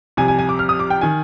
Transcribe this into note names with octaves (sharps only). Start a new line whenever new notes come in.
C2 C3 F3 G#5
G#5
G#5
D6
F6
D#6
D6
G5
D#3 G#5